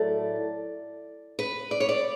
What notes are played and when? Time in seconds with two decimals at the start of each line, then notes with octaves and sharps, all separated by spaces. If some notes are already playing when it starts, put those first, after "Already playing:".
Already playing: A2 F#3 A3 D5
1.39 B4
1.71 D5
1.80 C#5
1.89 D5